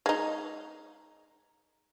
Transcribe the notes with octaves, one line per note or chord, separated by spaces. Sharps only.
G#3 D#4